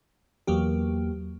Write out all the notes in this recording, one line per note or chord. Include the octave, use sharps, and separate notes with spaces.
E2 F#3 A#3 G4